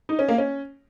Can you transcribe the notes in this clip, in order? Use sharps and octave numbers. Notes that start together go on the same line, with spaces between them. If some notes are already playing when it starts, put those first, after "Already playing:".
D#4
C#4
A#3
C#4